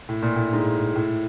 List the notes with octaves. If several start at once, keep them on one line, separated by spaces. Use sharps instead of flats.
A2
A#2
A2
G#2
A2